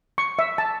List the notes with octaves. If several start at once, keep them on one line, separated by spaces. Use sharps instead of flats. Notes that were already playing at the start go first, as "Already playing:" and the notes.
C#6
E5
A5